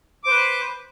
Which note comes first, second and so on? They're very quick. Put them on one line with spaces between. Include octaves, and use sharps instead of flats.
D6 C5 B4